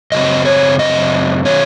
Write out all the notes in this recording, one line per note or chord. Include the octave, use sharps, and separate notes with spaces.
F#2 C#3 F#3 C4 D#5
C#5
D#5
D#3 F#3 C#4 C#5